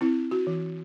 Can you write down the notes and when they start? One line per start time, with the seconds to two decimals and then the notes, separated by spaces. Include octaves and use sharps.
0.01 C4 E4
0.31 F#4
0.47 E3